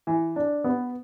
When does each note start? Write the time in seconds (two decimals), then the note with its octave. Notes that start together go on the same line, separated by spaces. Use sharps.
0.07 E3
0.36 D4
0.64 B3